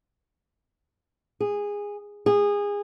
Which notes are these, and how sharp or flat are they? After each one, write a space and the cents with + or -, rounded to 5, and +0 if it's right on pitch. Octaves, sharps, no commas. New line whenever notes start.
G#4 -15
G#4 -25